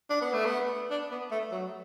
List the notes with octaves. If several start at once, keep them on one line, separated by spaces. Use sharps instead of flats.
D4
B3
A3
B3
D4
B3
A3
F#3